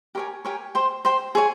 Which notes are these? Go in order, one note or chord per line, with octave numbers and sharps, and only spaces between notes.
G4 A#4 C#5 G#5
G4 A#4 C#5 G#5
C5 G5 C6
C5 G5 C6
G#4 C#5 G#5